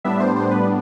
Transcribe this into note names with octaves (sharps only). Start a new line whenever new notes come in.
A2 G3 B3 D4 E5
C5
C5
B4